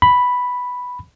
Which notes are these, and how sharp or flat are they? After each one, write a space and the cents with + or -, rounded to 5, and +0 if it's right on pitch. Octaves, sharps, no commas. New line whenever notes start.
B5 +0